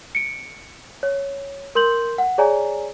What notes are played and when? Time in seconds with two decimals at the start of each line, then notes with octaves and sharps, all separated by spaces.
0.15 C#7 D7
1.03 C#5
1.75 A#4 C6 G6 F#7
2.18 F#5
2.38 G#4 C#5 D5 G#5 A#5